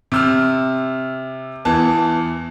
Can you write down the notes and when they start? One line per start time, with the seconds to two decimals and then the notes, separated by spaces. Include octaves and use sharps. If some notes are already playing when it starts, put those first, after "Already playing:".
0.12 C3 E6 F6
1.65 E2 E3 A5